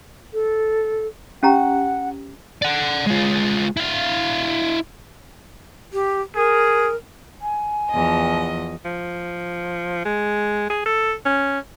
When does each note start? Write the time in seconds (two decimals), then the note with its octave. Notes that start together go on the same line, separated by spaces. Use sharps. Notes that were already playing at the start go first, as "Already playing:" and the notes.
0.33 A4
1.43 C#4 G4 F#5 A#5
2.62 D5 F#5
3.06 G#3 F4
3.77 E4 F5
5.93 G4
6.36 G#4 A#4
7.42 G#5
7.91 E2 F3 D#5
8.85 F3
10.05 G#3
10.70 G#4
10.86 A4
11.26 C#4